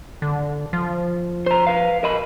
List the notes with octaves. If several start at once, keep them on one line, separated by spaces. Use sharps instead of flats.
D3
F3
C5 A#5
B4 F5
A#4 D#5 B5